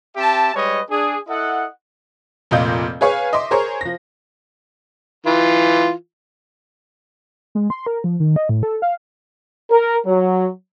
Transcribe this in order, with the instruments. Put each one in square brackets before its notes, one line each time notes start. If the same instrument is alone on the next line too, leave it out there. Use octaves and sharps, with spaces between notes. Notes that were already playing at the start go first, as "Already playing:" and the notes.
[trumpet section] C4 G4 E5 A5
G3 G#3 B4 C#5 D#5
D4 G#4
E4 A4 D#5 F#5
[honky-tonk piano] F1 A#2 F4 D#5 G6
G#4 B4 C#5 F5 G#5 C#6
D#5 E5 C6 D6
G#4 A#4 C5 C#5 A#5 C#6
F3 A#6
[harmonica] E3 F4
[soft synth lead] G#3
C6
A#4
F3
D#3
D#5
A2
A4
F5
[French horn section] A#4
F#3